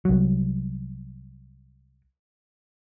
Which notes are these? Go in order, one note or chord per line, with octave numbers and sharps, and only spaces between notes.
C2 F#3